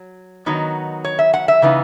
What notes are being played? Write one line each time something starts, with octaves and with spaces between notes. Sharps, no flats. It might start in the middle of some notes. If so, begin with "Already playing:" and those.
Already playing: F#3
D#3 F#3 B3 D#4
C#5
E5
F#5
E5
C#3 E3 B3 D#4